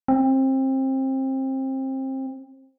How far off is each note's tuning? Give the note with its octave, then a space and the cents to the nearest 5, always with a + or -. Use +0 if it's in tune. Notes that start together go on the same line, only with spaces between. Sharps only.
C4 +25